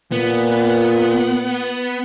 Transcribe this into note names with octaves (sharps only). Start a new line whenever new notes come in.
A#2 B3